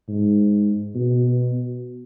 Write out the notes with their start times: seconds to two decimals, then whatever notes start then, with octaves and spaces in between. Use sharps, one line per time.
0.08 G#2
0.95 B2